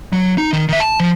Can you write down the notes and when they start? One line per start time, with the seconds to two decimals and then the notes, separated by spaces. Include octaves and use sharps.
0.13 F#3
0.38 D#4
0.53 D#3
0.69 D#3 E5
0.80 A5
1.00 F3